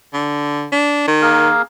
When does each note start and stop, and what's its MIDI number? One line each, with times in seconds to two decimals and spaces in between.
0.13 0.67 50
0.72 1.04 62
1.08 1.50 51
1.22 1.62 58
1.22 1.62 68
1.22 1.62 70